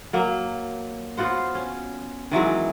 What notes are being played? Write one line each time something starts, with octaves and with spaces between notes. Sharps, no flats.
F#3 A#3
B3 F4 F#4 C5
C#4
D#3 E3 F#3 G#3